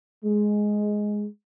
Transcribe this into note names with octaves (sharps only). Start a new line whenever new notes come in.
G#3